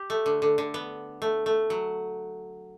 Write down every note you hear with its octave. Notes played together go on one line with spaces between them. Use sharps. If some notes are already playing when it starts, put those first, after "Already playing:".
Already playing: G4
A3
D3
D3
D3
B3
A3
A3
F#3